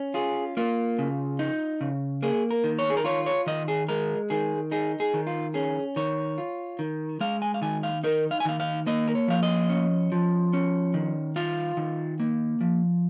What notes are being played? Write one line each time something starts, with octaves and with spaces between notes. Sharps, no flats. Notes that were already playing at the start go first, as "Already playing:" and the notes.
Already playing: C#4
F4 G#4
A#3 F4
C#3
D#4
C#3
A#3 G#4
A#4
D#3
C#5
G#4
A#4
F4 C#5
C#5
D#3 D#5
G#4
G#3 A#4
D#3 G#4
D#4 G#4
G#4
D#3
F4
C#4 G#4
D#3 C#5
F4
D#3
G#3 F5
G#5
F5
D#3 G#5
F5
D#4 A#4
F5
G#5
D#3 F5
F5
A#3 D#5
A#4
C#5
F3 F5
D#5
C#4
F3
C#4
D#3
F4 F5
D#3
A#3
F3